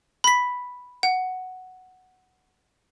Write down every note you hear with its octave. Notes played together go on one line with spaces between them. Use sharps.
B5 B6
F#5